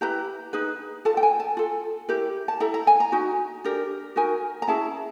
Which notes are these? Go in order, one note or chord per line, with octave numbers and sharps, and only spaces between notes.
E4 G4 B4 A#5
D#4 G#4 B4
F4 A4 A5
G5
G#5
A5
F4 A4
E4 G4 A#4
A5
E4 A4 A#5
A#5
G#5
A#5
D#4 F#4
D4 G4 A#4
D#4 F#4 A#4 G#5
A#5
C#4 E4 G#4 A5